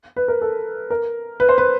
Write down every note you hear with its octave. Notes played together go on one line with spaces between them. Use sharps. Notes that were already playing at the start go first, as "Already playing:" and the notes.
B4
A#4
A4
A#4
B4
C5
B4